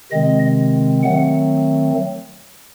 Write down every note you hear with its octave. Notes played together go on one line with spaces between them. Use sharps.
C3 D#3 G#3 C4 D#5
D#3 F#3 A3 C4 F#5